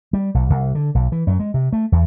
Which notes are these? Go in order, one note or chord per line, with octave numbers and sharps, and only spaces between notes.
G3
B1
C2
D3
B1
E3
F#2
G#3
C3
A3
E2